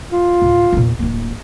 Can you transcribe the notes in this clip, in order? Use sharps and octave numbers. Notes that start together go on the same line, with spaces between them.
F4
D2 A2
E2 A#2
D1 A#3